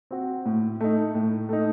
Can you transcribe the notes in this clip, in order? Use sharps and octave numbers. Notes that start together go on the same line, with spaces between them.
C4 F#4
A2
A3 D#4
A2
A3 D#4